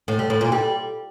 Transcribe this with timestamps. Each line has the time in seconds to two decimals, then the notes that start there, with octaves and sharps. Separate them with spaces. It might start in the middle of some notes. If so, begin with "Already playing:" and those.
0.08 A2
0.19 G3
0.30 A2
0.41 A#2
0.52 G3